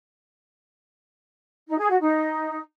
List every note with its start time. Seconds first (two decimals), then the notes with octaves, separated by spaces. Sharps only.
1.68 D#4
1.78 G#4
1.89 F#4
2.00 D#4